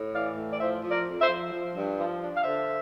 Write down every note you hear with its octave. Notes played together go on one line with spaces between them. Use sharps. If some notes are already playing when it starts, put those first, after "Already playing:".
Already playing: A2
E3 D5 F5
A2
D5
F3 C5 E5
F3
A#4 D5
F2
C5 E5
F3
F3
G2
F3
D4
F5
D3 C5 E5